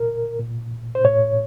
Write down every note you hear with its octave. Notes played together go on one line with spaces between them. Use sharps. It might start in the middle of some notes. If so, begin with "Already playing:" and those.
Already playing: A#2 A#4
A#2
C5
A2 C#5